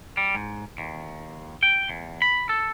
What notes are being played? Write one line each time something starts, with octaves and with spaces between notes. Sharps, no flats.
G3
G#2
D#2
G5
E2
B5
A4